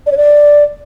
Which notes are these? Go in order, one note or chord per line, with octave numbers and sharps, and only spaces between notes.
D5
C#5
D5